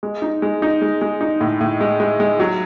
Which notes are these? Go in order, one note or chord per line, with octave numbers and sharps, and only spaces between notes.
G#3
D#4
G#3
D#4
G#3
G#3
D#4
A2
A2
G#3
G#3
G#3
F#3